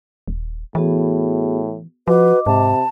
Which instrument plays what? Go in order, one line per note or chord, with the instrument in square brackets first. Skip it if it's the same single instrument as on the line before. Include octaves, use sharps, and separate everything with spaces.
[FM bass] D#1
[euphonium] A2 [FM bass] E3 [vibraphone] B3 F#4 G#4
[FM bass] F3 [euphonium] F#4 [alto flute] B4 [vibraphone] D#5 D6
[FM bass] G#2 [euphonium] C3 [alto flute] A5